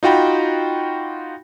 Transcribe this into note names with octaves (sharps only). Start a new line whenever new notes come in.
D#4 F4 F#4 G5 B5